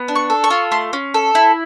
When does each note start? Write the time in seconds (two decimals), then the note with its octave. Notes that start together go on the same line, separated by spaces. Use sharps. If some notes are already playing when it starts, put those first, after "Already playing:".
Already playing: B3
0.08 D4
0.16 C#6
0.30 A4
0.44 C#6
0.50 F4
0.72 A3 C6
0.93 C#4
1.14 A4
1.35 E4